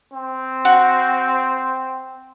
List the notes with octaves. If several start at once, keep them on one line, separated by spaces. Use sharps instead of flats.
C4
F#4